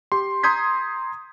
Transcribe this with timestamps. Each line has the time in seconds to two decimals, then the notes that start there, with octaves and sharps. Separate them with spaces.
0.12 G4 C6
0.43 A#5 C6 D#6 G6 G#6 B6